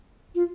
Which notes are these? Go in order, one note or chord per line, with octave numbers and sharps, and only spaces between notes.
F4